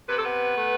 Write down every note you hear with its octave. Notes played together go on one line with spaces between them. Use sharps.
C3 B4
A4
B3 B4
A3